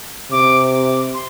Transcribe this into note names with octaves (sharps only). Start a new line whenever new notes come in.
C3 D6
D6
C6